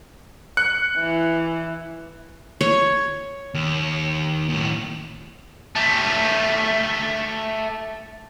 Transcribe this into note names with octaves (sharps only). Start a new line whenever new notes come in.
F#6 C#7
E3
C#5
D#2
D#2 A2
A3 G4